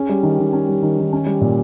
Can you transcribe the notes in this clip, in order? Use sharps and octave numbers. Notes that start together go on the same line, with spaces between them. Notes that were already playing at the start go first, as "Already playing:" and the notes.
Already playing: C#4 G#4
G3
D#3
D#3
C#4
G3
D#3
D#3
C#4
G3
A#2